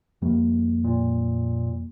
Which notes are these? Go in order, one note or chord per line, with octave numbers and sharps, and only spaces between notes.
F2 G3 A#3
A#2